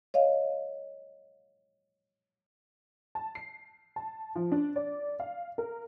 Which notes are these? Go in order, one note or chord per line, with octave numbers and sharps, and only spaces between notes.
C#5 D#5 F5
A5
C7
A5
F3
D4
D5
F5
A#4